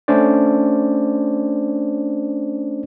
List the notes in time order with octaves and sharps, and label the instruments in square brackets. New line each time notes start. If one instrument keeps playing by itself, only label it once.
[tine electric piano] A3 C#4 D4 C5 D5